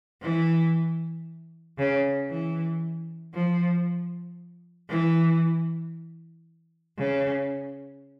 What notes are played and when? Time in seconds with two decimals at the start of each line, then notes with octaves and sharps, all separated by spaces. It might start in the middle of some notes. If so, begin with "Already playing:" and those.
0.22 E3
1.78 C#3
2.30 E3
3.34 F3
4.89 E3
6.98 C#3